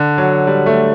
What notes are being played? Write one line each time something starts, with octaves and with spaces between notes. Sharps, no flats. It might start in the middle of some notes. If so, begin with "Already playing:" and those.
Already playing: D3
F#3
G3
A3